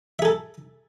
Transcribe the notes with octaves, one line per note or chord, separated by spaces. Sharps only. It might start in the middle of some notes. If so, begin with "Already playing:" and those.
G#4 A4 E5